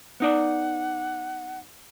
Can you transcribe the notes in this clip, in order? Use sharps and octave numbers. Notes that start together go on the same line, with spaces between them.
B3 D#4 D5 F#5